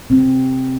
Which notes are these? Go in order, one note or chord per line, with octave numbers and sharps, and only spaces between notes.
C3 C4